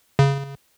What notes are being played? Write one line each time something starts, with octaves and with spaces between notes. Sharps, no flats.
C#3